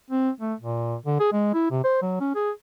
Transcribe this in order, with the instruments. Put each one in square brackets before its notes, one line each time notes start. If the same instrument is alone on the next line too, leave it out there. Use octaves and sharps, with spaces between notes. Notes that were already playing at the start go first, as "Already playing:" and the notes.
[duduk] C4
A3
A#2
D3
G#4
G#3
E4
C3
C5
F#3
C#4
G#4